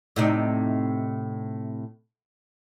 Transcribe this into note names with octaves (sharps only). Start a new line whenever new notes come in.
A2 C3 D#4